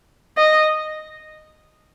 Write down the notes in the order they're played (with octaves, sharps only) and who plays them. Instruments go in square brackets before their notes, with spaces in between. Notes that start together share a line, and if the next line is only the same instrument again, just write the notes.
[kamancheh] D#5